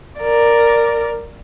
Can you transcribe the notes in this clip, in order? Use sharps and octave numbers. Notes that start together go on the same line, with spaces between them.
A#4 D5